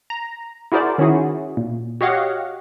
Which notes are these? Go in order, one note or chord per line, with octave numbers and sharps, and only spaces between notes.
A#5
E4 F#4 G#4 A#4 C5 D5
D#3 C#4 E4 F#4 G#4
A#2
F#4 G4 C#5 D#5 F5 F#5